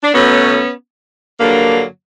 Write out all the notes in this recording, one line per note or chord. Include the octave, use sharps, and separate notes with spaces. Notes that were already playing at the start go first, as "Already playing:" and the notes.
D4
B2 F#3 A3 B3 C#4
G2 D3 F#3 A#3